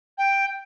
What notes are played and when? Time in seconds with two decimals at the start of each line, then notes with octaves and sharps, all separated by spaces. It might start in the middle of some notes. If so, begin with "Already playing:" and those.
0.18 G5